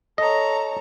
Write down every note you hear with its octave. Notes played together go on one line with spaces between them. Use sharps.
A4 C#5 D#5 A#5